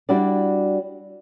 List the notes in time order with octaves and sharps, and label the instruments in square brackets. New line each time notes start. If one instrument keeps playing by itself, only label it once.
[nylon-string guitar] G3 D4 E4 F#4 G4 D5